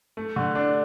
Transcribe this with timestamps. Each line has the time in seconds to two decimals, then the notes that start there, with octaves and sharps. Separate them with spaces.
0.17 A3
0.36 D3
0.55 D4